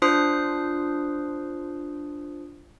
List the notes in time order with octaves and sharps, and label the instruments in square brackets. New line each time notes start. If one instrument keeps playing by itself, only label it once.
[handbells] D4 F4 C5 D#6 F#6 C7